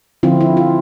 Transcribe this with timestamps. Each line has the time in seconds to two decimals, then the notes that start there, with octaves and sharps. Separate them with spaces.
0.23 D3 F3 C4 E4 F4
0.40 E4
0.57 F4